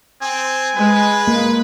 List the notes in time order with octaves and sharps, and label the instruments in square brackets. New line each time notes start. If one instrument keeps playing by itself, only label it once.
[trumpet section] C4 [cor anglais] G#5
[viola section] G#3 [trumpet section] B4
[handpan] A#3